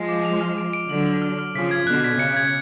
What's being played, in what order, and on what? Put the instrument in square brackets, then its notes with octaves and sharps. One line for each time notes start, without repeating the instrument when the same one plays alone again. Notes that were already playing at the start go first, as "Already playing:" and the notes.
Already playing: [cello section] F3 G#3
[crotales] D6
F7
F6
D7
D7
[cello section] D3 F#3 [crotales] F#7
[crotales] F#7
F6
F6
[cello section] C#3 F3 [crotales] B6
[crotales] G#6
[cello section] B2 D3 [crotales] F#6
[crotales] B6
[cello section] C#3 [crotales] C#7
[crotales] G#6